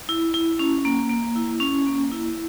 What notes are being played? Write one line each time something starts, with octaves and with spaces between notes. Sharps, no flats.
E4
E4
C#4
A#3
A#3
E4
C#4
A#3
E4